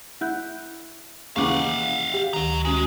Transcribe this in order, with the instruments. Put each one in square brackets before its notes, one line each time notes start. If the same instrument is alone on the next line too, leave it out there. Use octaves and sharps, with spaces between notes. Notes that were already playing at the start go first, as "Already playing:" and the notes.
[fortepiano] E4 [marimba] F#5 F#6 G6
[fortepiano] D#2 C#3 E3 [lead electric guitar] F5 F#5 [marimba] C#6 D6
[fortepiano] G4
[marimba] D2 D#3 [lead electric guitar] F#3 A#5
[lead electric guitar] G#3 [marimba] C#4 F#4